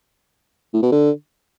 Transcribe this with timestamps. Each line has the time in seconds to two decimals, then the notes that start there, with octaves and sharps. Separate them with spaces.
0.74 A2
0.83 B2
0.92 D3